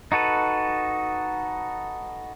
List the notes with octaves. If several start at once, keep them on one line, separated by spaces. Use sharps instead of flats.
D#4 F#4 A4 B4